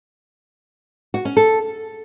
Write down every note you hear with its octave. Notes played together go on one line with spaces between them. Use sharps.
F#4
C#4
A4